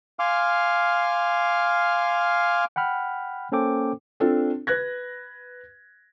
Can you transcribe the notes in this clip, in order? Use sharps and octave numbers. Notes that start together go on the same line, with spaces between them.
F5 G#5 C6 D6 F6
F#5 G5 B5 F6
A#3 C#4 A4 C5 G5 D6
C4 D4 F4 A4
B4 F#6 G#6 A#6